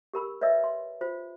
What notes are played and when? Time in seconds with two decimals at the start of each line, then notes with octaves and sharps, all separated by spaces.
0.14 G4 A#4 B5 E6
0.41 B4 C#5 D#5 E5 E6
0.64 C6
1.01 F4 C5